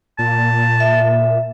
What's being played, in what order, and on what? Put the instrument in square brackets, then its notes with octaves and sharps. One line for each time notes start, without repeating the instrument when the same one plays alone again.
[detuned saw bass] A#2 [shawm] A5
[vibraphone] E5